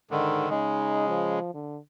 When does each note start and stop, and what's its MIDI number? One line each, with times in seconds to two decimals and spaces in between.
0.11 0.47 44
0.11 0.49 50
0.11 0.49 51
0.50 1.39 49
0.50 1.39 56
0.50 1.07 63
1.08 1.51 53
1.54 1.78 50